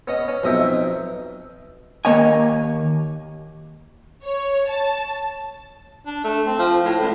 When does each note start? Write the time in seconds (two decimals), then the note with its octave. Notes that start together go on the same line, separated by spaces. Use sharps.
0.08 B3 C#4 D#5
0.28 C#4
0.43 B1 F2 B2 D#5 E5 G5
2.05 D#2 G#3 A#3 C#5 D#5 G#5
4.23 C#5
4.67 A5
6.06 D4
6.24 A3
6.46 C4
6.59 F3
6.85 A2
7.00 C#2